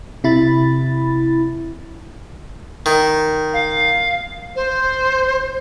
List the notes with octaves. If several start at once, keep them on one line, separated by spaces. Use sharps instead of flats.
C3 E4 B5 A6
D#3
F5
C5